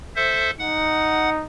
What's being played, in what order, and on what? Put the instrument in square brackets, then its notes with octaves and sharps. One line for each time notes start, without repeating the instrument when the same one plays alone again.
[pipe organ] A4 C5 E5
[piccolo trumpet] D#4 [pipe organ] F#5